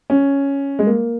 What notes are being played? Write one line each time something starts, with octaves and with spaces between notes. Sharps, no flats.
C#4
G#3
A#3